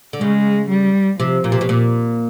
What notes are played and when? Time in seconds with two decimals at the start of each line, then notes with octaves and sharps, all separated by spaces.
0.13 D3
0.21 C#3 G#3
0.70 G3
1.19 C3 F3
1.44 A#2
1.52 C3
1.61 B2
1.69 A#2